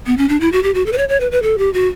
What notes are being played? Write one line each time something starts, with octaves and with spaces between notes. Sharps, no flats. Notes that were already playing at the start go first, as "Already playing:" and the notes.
B3
C#4
D4
E4
F#4
G4
F#4
A4
B4
C#5
C#5
B4
B4
A4
G4
F#4